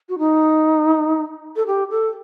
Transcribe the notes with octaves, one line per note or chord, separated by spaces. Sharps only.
F#4
D#4
A4
G4
A4